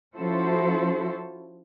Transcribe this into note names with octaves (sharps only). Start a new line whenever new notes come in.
F3 C#4 E4 F#4 A4 C5